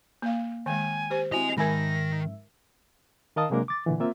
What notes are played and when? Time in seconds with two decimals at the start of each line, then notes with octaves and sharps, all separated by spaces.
0.22 A#3 F5
0.66 D#3 G#3 G5 G#5
1.10 G4 C5
1.32 C4 E4 F#4 D#5 G#5 F7
1.57 G#2 D#3 A#4 E5 G#5 B5 A#6
3.36 D#3 A#4 D#5 F5 A5 D#6
3.50 C3 F#3 G#3 A#3 D4 A#4
3.68 D6 A6
3.86 A#2 D3 E3
4.00 A#3 C4 F4 E5